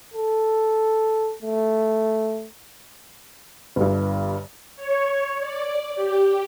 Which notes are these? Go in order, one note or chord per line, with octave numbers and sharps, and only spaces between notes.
A4
A3
G1 G2
C#5
D5
G4